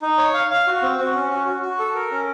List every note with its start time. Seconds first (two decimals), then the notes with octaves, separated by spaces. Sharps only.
0.02 D#4
0.18 C#5
0.34 F5
0.50 F5
0.67 F#4
0.82 C4
0.98 F#4
1.15 C#4
1.31 F#4
1.46 F#4
1.62 F#4
1.79 A4
1.95 A#4
2.11 C#4